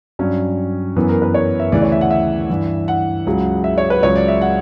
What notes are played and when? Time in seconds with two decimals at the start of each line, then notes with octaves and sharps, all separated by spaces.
0.19 G2 F#3 C#4
0.96 F#2 E3 B3
1.09 A#4
1.22 B4
1.34 C#5
1.60 E5
1.72 D2 C#3 E3 D5
1.82 C#5
1.92 E5
2.01 F#5
2.10 E5
2.49 G2 E3
2.88 F#5
3.27 C#2 C#3 F#3
3.64 E5
3.78 C#5
3.90 B4
4.02 C#2 C#3 F#3 C#5
4.16 D5
4.28 E5
4.41 F#5